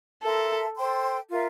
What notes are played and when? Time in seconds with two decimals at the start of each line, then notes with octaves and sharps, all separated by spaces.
0.23 A4 A#4 E5 A5 C6
0.75 A4 C5 G5 C6
1.29 F4 A#4 E5